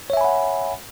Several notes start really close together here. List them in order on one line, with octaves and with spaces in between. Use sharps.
C#5 E5 G#5 B5 F#5